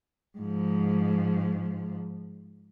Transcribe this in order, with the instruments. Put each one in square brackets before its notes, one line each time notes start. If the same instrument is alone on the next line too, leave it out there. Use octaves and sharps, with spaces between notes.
[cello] G#2 F3